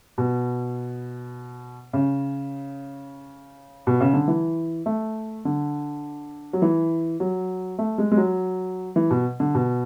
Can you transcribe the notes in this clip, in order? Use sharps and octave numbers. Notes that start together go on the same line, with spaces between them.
B2
C#3
B2
C#3
D3
E3
A3
D3
F#3
E3
F#3
A3
G#3
G#3
F#3
E3
B2
D3
B2